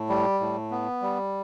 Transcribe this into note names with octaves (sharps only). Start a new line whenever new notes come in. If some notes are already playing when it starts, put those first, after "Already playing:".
Already playing: A2
G3
A2
B3
G3